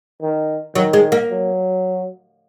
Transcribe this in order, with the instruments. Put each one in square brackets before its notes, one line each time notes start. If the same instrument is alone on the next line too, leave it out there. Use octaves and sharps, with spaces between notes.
[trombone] D#3
[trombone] D#3 [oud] F#3
[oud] G#3
A#3
[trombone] F#3